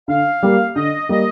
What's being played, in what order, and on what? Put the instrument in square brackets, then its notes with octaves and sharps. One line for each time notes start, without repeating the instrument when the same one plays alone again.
[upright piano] D3 [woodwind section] F5
[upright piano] G3 A#3
[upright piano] D3 [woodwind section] D#5
[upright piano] G3 A#3 [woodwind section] D#5